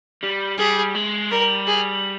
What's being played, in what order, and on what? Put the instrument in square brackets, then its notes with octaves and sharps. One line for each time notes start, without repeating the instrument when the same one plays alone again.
[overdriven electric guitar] G3
[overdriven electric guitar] G3 [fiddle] G#4
[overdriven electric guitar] G#3
[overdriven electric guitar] G3 [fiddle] A#4
[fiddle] G#4